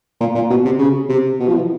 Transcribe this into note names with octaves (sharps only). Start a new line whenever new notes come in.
A#2
A#2
B2
C3
C#3
C3
B2
F3
E3